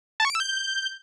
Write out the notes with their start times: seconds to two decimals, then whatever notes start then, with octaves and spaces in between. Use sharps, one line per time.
0.20 A5
0.25 C#6
0.30 D7
0.35 E6
0.40 G6